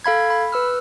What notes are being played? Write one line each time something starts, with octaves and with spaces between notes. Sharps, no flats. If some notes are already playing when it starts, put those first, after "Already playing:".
A4 F5 B5 G#6
B5
B4 E6 F6